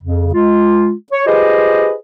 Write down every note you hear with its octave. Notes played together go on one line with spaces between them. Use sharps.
F2 C#3
G#3 F4
C#5
F4 G4 G#4 B4 C5 D#5